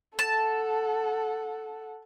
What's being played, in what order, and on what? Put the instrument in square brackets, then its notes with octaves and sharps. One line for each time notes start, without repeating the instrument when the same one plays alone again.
[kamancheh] A4 F#5 [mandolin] A5